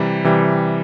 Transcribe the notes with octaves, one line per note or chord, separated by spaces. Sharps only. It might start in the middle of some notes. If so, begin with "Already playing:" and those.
Already playing: C3 E3 G3
C3 E3 G3